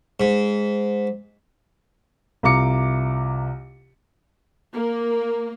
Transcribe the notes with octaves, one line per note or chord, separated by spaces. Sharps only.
G#2
C2 F4 A#5 D6 C#7
A#3